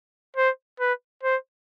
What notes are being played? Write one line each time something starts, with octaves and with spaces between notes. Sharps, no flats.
C5
B4
C5